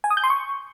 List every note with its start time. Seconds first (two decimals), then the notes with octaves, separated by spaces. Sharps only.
0.04 G#5
0.10 D#6
0.17 G6
0.24 C6
0.30 C#6